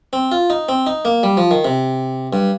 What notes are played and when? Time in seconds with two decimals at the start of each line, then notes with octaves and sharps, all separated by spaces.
0.13 C4
0.32 F4
0.50 D#4
0.69 C4
0.87 D#4
1.05 A#3
1.23 G3
1.37 F3
1.51 D#3
1.65 C3
2.33 G2